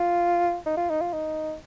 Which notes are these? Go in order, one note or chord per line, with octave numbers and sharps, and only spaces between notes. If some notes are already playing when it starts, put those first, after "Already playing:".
Already playing: F4
D#4
F4
D#4
F4
D#4